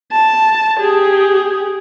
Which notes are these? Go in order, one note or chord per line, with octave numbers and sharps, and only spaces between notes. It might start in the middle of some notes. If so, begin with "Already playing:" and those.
A5
G4 G#4